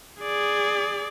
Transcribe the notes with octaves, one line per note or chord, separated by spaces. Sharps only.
G#4 D5